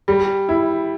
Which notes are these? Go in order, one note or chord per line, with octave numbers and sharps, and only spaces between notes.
G3
E4